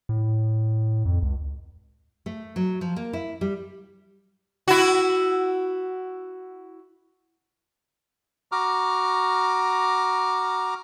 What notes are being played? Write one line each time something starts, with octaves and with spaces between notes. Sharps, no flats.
A2
F2
C#2
A3
F#3
F3
A#3
E4
G3
E4 F#4
F#4 A#5 D6 F6